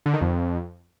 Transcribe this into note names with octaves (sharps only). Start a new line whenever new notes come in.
D3
D#3
F2